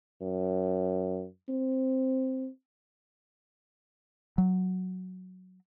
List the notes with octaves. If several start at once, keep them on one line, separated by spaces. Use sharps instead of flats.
F#2
C4
F#3